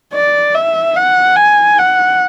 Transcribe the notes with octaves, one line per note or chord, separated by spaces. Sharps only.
D5
E5
F#5
G#5
F#5